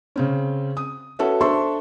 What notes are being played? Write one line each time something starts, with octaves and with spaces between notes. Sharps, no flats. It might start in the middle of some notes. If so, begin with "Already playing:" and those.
C#3 C4 C#4
D#6
C#4 F#4 A4 B4 E5
D4 A4 C5 E5 C6 C#6